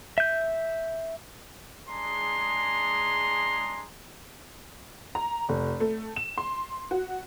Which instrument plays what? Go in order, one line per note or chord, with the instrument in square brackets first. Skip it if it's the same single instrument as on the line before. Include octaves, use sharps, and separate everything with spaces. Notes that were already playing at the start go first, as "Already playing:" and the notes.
[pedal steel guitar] E5 G6
[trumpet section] G#3 D4 G#4 A#5 C6
[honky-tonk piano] A#5
F1
A3
E7
C6
F#4